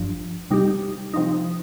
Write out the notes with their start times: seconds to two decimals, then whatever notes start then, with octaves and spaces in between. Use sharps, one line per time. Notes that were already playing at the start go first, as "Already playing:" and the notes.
Already playing: G1 G2 F3
0.50 C3 G3 D#4 G4
1.14 C3 F3 D#4